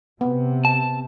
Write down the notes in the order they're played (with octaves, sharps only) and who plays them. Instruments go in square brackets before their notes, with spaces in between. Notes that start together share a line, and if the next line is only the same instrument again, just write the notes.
[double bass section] C3 [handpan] B3
[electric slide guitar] A5